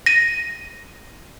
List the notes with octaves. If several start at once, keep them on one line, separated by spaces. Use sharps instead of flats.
A#6 D#7